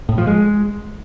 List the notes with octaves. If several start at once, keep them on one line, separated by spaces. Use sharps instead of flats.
A2
F3
G#3